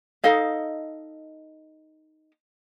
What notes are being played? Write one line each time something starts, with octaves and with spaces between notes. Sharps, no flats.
D#4 A4 D#5 F5